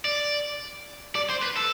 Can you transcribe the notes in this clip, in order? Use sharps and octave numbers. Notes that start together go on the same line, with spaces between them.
D5
D5
C5
B4
A4